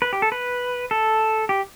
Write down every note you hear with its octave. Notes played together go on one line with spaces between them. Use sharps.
B4
G4
A4
B4
A4
G4